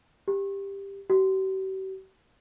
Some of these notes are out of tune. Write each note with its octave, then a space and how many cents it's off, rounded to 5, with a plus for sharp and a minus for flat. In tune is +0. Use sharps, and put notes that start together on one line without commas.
G4 +15
G4 -45